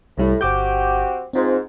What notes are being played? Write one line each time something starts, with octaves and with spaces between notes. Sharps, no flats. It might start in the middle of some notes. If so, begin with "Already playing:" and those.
C2 A2 G3 E4
G1 C4 F#4 G4 D6 G6
G#2 C4 F4 C5